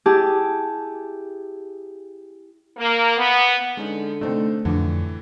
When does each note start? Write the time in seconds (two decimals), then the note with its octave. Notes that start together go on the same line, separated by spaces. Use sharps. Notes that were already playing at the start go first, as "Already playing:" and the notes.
0.06 E4 G4 G#4 A5
2.77 A#3
3.17 B3
3.77 D3 G#3 C#4 D#4
4.21 A3 C4 D4 D#4
4.65 F2 A2 D3 E3